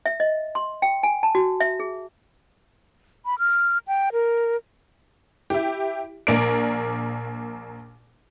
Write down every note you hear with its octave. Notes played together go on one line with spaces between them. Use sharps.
E5
D#5
C6
G5
G#5
A5
F#4
E5
G#4
B5
F6
G5
A#4
E4 G4
A#1 A#3 A#4 D5 D7